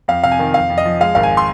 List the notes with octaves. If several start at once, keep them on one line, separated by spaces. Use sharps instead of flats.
F2 F5
C3 F5
G#5
D#3
F2 F5
F2
D#5
F3
G#3 F5
G#1 F5
G#5
C6